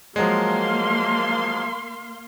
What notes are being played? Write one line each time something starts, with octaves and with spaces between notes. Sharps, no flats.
F3 F#3 G#3 A#3 F5 C6